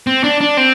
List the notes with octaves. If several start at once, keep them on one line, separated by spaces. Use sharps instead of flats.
C4
D4
D4
C4